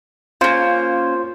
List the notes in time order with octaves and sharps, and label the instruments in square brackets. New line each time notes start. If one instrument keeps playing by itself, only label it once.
[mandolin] A#3 C#4 [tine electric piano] F4 C5